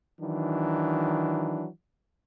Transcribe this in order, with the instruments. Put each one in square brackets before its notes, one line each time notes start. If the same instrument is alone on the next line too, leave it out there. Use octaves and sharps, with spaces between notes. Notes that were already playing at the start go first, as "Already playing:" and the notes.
[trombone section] D#3 E3 F#3 D4